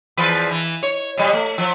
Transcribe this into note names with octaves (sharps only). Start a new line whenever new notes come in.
E2 F3 B4
E3
C#5
B2 G3
A3
F3